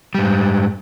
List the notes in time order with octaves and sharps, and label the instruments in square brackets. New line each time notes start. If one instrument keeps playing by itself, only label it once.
[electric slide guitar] G#2 G3